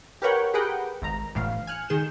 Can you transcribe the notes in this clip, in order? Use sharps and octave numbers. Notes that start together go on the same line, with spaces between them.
G4 A#4 B4 C#5 F#5 G5
G4 G#4 A#4 B4 F#5 G5
G#1 A#5
G1 A2 E3 F5
G#5 F6 F#6 C#7
D#3 G#4 G6 E7